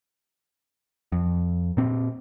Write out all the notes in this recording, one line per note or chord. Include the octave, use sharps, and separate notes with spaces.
F2
A#2 C4